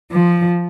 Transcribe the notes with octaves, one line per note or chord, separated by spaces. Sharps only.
F3